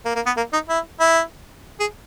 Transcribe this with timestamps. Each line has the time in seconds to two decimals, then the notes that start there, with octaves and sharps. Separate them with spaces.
0.05 A#3
0.15 A#3
0.26 B3
0.37 A#3
0.53 D#4
0.69 E4
1.00 E4
1.80 G#4